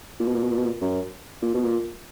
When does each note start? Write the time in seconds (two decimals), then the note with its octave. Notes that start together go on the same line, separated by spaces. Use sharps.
0.19 A#2
0.27 B2
0.35 A#2
0.43 B2
0.51 A#2
0.58 B2
0.66 A#2
0.81 F#2
1.42 A#2
1.54 B2
1.65 A#2